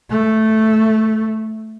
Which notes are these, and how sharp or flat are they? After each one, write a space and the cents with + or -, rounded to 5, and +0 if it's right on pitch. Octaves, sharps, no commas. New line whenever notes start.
A3 -5